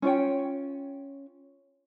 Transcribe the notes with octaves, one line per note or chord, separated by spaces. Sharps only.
C#4 F4 C#5 G5